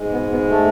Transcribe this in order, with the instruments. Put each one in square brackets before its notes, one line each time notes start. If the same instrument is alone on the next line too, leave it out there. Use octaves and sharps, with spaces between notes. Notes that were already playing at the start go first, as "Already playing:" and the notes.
Already playing: [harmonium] G#2 G#3
B2 B3
B2 B3
A3